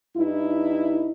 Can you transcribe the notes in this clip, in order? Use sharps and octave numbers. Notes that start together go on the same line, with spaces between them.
G2 D#4 E4